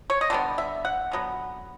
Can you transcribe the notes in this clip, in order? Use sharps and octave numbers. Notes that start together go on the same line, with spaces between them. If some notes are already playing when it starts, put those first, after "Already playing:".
C#5
D#5
D3 G3 B3 D5
E5
F#5
D3 F#3 B3